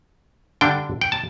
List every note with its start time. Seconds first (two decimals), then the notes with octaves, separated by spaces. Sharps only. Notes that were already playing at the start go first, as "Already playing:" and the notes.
0.61 D3 G3 D4 G5
1.01 G5
1.12 A5